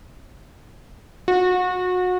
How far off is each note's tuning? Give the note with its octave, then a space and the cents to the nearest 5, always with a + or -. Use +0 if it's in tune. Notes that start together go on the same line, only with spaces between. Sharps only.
F#4 -30